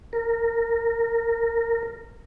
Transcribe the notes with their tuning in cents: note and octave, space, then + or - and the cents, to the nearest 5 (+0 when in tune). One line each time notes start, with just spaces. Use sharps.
A#4 -15